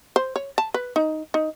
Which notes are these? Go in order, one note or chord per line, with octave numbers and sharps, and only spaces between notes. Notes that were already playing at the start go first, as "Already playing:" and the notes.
C5
C#5
A5
B4
D#4
D#4